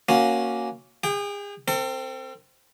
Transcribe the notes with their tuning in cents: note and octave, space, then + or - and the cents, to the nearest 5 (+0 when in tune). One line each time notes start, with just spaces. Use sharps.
A#3 +0 C#4 +0 F#4 -10
G#4 -40 G5 +0
C4 +0 A4 +45